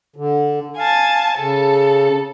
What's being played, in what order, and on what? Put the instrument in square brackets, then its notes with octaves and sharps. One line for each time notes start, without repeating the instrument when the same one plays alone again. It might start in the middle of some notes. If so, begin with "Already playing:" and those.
[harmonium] D3
[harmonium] F5 [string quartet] G#5 A5
[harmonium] C#3 [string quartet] A4